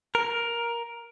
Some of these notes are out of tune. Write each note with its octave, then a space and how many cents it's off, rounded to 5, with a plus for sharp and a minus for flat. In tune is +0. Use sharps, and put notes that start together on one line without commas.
A#4 +10